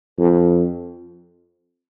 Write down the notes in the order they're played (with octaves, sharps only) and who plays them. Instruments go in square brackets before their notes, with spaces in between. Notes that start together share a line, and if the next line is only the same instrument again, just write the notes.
[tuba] F2